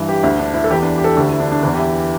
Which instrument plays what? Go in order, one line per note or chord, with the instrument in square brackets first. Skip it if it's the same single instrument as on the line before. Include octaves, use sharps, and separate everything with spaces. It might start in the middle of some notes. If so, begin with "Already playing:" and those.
Already playing: [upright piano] G2 E3
G4
D2 D3 E4
D4
E4
A4
E2 E3 G4
D4
G4
A4
D2 D3 G4
E4
D4
D4
E2 E3 D4
G4
E4